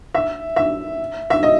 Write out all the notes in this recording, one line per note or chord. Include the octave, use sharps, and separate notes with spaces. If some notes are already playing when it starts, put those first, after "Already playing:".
E5
E5
E5
D#5